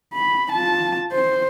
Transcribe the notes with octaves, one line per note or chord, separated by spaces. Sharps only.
B5
F4 A5
C5